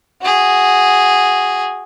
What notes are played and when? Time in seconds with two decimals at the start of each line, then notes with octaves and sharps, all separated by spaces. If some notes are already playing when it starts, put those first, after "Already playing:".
0.22 F#4 G#4